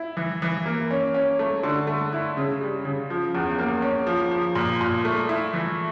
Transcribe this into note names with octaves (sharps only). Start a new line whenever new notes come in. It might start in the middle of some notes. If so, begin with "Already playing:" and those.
Already playing: E4
E3
E3
A#3
C#4
C#4
A3
D3
A3
E4
C#3
G3
C#3
F3
E2
A#3
C#4
F3
F3
A#2
A#2
A3
E4
E3